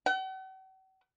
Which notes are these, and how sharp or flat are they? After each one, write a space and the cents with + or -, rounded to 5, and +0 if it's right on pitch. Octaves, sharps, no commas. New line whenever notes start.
F#5 +45